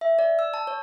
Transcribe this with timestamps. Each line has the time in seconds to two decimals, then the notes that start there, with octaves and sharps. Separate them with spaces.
0.01 E5
0.19 D5
0.39 E6
0.54 A5
0.67 C#5